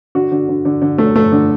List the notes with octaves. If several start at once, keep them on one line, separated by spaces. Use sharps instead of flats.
D3 F#4
D3
D3
D3
D3
A3
A3
D3